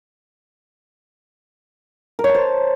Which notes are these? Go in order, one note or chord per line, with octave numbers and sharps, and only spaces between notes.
A#4
C#5
A5
C5